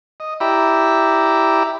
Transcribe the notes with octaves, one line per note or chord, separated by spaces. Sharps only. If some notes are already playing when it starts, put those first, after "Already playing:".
D#5
E4 G4 D5 E5 A#5 B5